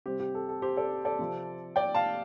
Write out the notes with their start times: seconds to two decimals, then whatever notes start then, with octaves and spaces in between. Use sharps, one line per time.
0.06 C3 G3 C4 G4
0.20 G4
0.35 A4
0.49 A4
0.62 G4 C5
0.77 A4 D5
1.05 A4 D5
1.19 C3 F3 C4
1.76 D5 G5
1.95 F5 A5